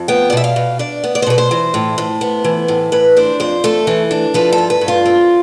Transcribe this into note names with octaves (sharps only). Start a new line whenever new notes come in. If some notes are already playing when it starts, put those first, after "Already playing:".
Already playing: F2
B3 G5
D5
B2 E5
F5
B2
D4 D5
B3
D5
C5
B2 B4
C5
E3
A2
A2
B3
E3
A2
E3 B4
D4 C5
F2 C5
A3 A4
E3
D4
F3 B4
A4
G2
B4
G2
F4
C4